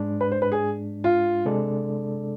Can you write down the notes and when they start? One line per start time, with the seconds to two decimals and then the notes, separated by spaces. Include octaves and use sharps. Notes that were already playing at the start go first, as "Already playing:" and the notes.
Already playing: G#2 G#3 D4
0.21 B4
0.32 C5
0.42 B4
0.52 G#4
1.04 F4
1.45 C3 G#3 D4 A4 D5